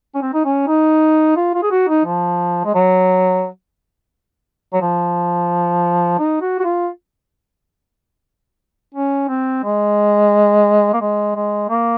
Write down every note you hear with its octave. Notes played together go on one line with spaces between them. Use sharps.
C#4
C4
D#4
C#4
D#4
F4
F4
G#4
F#4
D#4
F3
G#3
F#3
F#3
F3
D#4
F#4
F#4
F4
C#4
C4
G#3
A#3
G#3
G#3
A#3